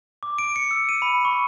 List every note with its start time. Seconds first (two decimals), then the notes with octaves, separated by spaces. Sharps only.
0.23 D6
0.38 D7
0.56 C#7
0.71 E6
0.89 D#7
1.02 B5
1.25 C#6